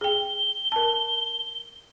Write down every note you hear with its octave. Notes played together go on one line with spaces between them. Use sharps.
G#4 G5 G7
A#4 A5